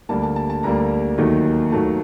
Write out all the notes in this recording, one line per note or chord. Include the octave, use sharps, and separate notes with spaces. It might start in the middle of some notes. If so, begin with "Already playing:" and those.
D2 D3 G3 A#3 A5
A5
A5
A5
D2 D3 G3 A#3 A#5
D#2 D#3 F#3 A3
D#2 D#3 F#3 A3 A5